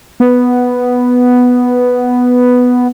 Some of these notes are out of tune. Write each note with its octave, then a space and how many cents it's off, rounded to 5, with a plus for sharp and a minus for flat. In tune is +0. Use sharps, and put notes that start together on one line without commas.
B3 +0